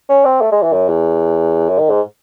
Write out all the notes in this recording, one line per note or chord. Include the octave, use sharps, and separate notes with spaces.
C#4
C4
A3
G#3
E3
F#2
E2
F#2
D#3
G#2